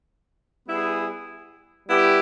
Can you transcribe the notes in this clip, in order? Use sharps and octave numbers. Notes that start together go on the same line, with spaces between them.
G3 B3 E4 G#4
G3 B3 E4 G4